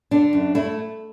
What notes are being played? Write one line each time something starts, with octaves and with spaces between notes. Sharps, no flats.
D3 D4
F#2
A3 E4